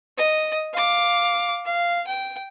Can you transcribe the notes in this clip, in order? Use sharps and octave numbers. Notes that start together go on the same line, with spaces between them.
D#5
F5 D6
F5
G5